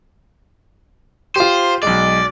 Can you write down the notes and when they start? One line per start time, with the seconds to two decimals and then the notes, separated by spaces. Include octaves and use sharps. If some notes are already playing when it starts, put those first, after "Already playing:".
1.36 F4 G4 C5
1.83 B1 G#3 D5